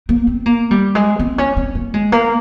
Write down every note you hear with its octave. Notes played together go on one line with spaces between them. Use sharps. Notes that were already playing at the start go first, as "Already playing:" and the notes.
A#3
C4
A#3
G3
G#3
C4
C#4
C4
A#3
G#3
A#3